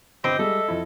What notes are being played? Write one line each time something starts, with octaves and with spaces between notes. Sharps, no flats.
G1 C4 G4 D#5 B5
G3 G#3 A4 E5
F2 E4